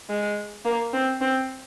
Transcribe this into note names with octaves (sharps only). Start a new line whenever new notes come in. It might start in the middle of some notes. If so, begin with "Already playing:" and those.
G#3
A#3
C4
C4